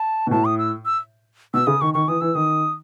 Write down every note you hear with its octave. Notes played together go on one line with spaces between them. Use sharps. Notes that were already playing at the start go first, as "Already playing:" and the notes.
Already playing: A5
B2
A2 A5
D#6
E6
E6
B2 E6
C#3 D#6
D#3 C#6
D#3 C#6
E3 D#6
E3 E6
D#3 D#6